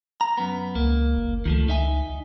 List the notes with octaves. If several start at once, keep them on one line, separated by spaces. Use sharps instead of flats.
A#5
F#2 B3
C#2 A#3
F#1
C#2 D#3 F3 A3
C#2 D#4 E5 G#5